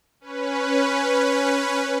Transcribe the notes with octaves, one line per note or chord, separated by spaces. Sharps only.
C#4 B4